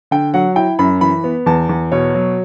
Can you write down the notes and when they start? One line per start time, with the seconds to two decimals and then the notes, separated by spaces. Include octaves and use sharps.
0.11 D3 G5
0.34 F#3 F#5
0.56 E4 G5
0.79 F#2 B5
1.01 E3 B5
1.24 B3
1.46 E2 A5
1.69 E2
1.92 B2 C#5
2.15 F#3